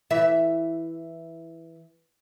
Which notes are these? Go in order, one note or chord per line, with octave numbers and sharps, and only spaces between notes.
E3 E5